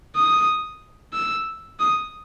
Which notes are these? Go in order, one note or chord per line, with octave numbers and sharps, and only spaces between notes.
D#6
E6
D#6